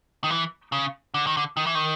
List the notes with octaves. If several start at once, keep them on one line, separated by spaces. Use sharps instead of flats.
D#3
E3
C#3
D3
D#3
D3
D#3
E3
D#3